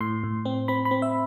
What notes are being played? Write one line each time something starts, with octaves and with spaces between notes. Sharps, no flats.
A2 C6
A2
C4
C4 B5
B5
C4
E5